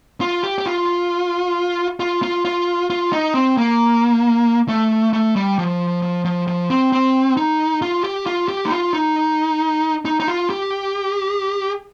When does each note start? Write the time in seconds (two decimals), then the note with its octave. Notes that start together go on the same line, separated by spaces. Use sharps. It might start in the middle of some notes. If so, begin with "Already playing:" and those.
0.21 F4
0.43 G4
0.58 G4
0.66 F4
2.00 F4
2.23 F4
2.45 F4
2.90 F4
3.12 D#4
3.34 C4
3.57 A#3
4.68 A3
5.13 A3
5.36 G3
5.58 F3
6.02 F3
6.25 F3
6.47 F3
6.70 C4
6.92 C4
7.37 D#4
7.82 F4
8.04 G4
8.26 F4
8.48 G4
8.66 D#4
8.71 F4
8.93 D#4
10.05 D#4
10.20 D#4
10.28 F4
10.50 G4